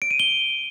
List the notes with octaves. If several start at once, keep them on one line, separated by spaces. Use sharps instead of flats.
D7
D#7
G7